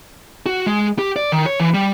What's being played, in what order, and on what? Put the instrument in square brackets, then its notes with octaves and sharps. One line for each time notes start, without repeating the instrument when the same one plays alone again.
[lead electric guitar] F#4
G#3
G4
D5
D#3
C#5
E3
G3